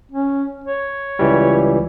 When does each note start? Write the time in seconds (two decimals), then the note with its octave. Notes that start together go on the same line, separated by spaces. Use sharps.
0.12 C#4
0.64 C#5
1.19 C#2 E3 G3